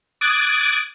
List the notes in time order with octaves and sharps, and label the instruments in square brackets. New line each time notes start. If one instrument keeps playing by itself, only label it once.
[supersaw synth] D6 D#6 F#6 G#6 A6 D7